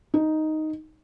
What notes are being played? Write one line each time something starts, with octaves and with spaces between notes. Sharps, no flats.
D#4